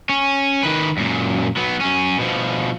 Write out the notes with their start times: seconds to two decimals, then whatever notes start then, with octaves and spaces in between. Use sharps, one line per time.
0.09 C#4
0.64 D#3 B4
0.98 F#2 A#2
1.57 F#3 B3
1.81 F#2 C#4
2.19 B2 F3